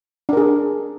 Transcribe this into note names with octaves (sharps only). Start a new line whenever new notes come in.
D4 G#4 A#4